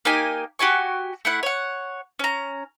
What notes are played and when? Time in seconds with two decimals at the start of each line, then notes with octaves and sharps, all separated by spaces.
0.05 A#3 D#4 G4 G#5
0.59 F#4 G4 G#5 C#6
1.25 A3 E4 F#5
1.43 C#5 F#5
2.19 C#4 A#5